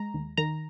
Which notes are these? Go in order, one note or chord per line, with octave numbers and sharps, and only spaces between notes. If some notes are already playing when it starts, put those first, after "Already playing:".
Already playing: G#3 A#5
D#2
D#3 A#5